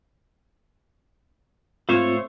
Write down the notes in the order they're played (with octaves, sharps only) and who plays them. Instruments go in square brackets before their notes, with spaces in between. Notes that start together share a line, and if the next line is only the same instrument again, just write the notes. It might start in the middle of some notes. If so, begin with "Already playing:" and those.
[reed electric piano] G#2 C4 F4 [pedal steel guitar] A3 C5 C#5